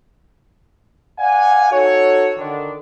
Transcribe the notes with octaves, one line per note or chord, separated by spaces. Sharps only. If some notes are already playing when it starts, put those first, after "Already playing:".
D5 F5 F#5 G#5
D#4 F#4 A4 C#5
D3 D#3 D4